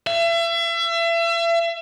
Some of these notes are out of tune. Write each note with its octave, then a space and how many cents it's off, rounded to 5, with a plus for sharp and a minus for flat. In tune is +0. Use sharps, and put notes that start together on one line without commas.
E5 +35